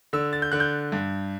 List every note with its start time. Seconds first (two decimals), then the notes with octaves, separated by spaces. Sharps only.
0.13 D3 E6
0.33 A6
0.42 G6
0.52 D3 F#6
0.60 G6
0.92 G2